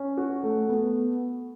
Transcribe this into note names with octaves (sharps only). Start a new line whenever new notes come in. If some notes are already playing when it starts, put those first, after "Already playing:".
Already playing: C#4
F#4
A3
B3